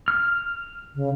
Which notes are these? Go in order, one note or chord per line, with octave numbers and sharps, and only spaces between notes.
F6
C#3